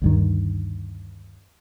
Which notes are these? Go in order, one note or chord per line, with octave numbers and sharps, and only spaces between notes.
D2 G2 D#3